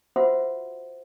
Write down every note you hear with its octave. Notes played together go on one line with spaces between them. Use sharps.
F4 F#4 B4 C5 E5 F#5